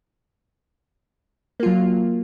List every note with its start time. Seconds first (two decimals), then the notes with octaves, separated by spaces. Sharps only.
1.60 A#3
1.63 F4
1.66 F#3